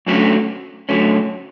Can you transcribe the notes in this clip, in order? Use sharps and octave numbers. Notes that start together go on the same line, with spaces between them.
F#2 D3 F#3 A3 C#4
F#2 D3 F#3 A3 C#4